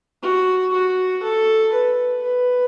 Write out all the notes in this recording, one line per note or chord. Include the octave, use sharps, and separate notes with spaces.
F#4
F#4
A4
B4
B4